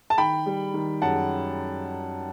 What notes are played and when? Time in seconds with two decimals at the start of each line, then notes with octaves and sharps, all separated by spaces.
0.10 A5
0.18 D#3 G5 B5
0.46 G3
0.74 D#3
1.02 F#2 F#5 A5